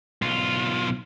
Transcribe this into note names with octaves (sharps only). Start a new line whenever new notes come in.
B1 F4